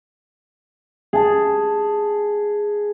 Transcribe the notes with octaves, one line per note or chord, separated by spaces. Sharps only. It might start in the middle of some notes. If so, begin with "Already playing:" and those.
G#4 A5